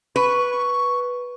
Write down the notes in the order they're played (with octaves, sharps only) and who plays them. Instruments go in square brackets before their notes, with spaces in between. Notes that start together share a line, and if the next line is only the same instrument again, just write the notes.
[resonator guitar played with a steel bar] B4 [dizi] C#6